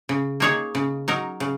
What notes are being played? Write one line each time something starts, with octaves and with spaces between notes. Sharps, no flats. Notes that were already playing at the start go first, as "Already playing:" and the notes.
C#3
A#3 D#4 G#4 C#5
C#3
F#3 D#4 A#4
C#3